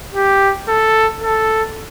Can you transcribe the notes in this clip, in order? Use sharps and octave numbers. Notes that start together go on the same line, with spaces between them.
G4
A4
A4